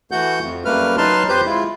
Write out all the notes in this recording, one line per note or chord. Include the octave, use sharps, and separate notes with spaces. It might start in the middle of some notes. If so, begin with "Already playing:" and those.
E3 A3 F#4 F#5 G6
F2
F#2 G3 A3 A#3 B4 F6
F#3 D#4 B4 A5 C6 F6
F2 G4 B4 C5 C6 G6
G#3 E4 F4